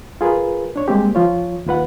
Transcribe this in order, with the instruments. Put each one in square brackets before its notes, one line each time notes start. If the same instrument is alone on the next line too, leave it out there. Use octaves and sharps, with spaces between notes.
[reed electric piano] F4 G#4 A#4 B4
D4 C#5
G3 G#3 A#3 C4 G4
F3 F4 C#5
D#2 F4 B4 F#5